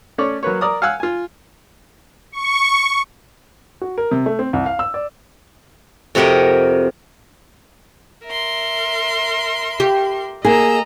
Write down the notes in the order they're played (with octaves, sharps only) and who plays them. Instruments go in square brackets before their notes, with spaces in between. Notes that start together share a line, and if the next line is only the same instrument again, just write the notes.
[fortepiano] A3 C#4 C#5 D5
F#3 A#3 B4 C#5
A#4 D5 A#5 D#6
F5 F#5 G#5 E6 F#6
F4 G#5
[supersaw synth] C#6
[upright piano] F#4
A#4
C3
A3
C4
C2
F5
E6
D5
[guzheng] F2 C3 F#4 G4 A#4 D#5
[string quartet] A#4 E5 C6
[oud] G4
[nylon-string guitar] A#3 G#4 [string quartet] D#5 A#5 E6